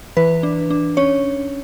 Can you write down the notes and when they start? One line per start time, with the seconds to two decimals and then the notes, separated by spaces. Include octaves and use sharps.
0.17 E3 B4
0.43 D4
0.70 D4
0.97 C#4 C#5